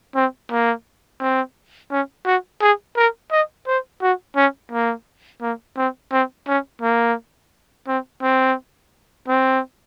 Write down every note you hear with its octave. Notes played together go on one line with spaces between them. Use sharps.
C4
A#3
C4
C#4
F#4
G#4
A#4
D#5
C5
F#4
C#4
A#3
A#3
C4
C4
C#4
A#3
C4
C4
C4